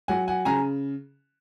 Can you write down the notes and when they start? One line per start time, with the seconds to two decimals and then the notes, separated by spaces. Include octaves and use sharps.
0.08 F#3 F#5 G#5
0.28 F#5 G#5
0.45 C#3 G#5 A#5